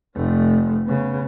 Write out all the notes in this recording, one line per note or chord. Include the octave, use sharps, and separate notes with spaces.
F1 A3
C#3 B3